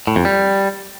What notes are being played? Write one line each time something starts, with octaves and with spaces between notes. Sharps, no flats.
A2
F2
G3